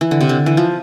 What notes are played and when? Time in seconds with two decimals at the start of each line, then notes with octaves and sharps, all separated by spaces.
0.01 E3
0.11 D3
0.21 C3
0.29 D3
0.46 E3
0.57 F3